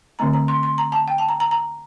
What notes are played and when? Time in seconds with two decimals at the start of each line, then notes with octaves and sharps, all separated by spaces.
0.19 D3 A3 C4 A#5
0.33 A#5
0.48 C6
0.63 C6
0.78 A#5
0.92 A5
1.08 G5
1.18 A5
1.29 A#5
1.40 A#5
1.51 A#5